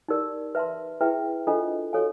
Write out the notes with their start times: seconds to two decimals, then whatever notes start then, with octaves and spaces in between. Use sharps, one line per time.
0.08 D#4 G4 A#4 D5
0.55 B4 E5 A5 C6
1.01 E4 G#4 B4 E5 G5
1.47 D4 F4 A4 C5 D#5
1.93 F#4 A4 C#5 F5 G#5